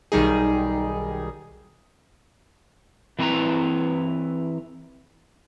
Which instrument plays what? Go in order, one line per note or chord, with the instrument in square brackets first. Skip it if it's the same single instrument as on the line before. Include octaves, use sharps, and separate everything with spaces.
[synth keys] B1 D#3 G3 D#4 G#4
[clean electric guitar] E3 C4 E4 B4 A#5